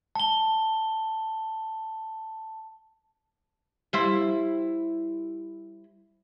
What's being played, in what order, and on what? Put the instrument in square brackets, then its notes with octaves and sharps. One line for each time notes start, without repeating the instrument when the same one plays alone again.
[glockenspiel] A5 G7
[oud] G3 E4 C5